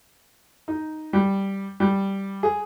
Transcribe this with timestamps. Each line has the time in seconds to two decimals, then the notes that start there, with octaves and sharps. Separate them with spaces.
0.68 D#4
1.13 G3
1.80 G3
2.43 G#4